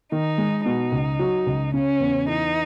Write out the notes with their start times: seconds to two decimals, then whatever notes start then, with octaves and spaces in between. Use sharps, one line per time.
0.12 D#3 D#4
0.38 G#3
0.66 B2 D#4
0.92 C#2
1.19 F#3
1.47 C#2
1.74 C#3 C#4
2.00 E2
2.28 E3 D#4